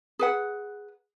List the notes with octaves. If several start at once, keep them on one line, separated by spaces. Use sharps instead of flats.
G#4 B4 F#5